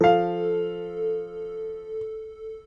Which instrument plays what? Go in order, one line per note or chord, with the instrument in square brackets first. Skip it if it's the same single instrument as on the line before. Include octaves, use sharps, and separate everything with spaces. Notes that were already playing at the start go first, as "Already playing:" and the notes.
[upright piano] F3 F5 [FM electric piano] A4